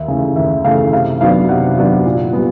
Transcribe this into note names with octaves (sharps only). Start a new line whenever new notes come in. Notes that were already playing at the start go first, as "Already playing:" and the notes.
Already playing: D#2 E5
C#3 E3 A3
D#2 E5
C#3 E3 A3 F5
C3 F5
D#3 F#3 B3 D4 F5
C3 F#5
D#3 F#3 B3 D4
A#2
G3 B3